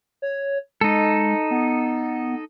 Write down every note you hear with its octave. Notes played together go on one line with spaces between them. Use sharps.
C#5
G#3 D#4 A4
B3